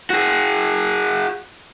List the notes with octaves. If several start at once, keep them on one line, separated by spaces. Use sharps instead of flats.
F#4 G#4